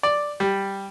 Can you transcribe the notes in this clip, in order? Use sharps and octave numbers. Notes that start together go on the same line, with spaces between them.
D5
G3